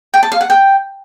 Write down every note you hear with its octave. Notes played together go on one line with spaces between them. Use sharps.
G5
A5
F5
F#5
G5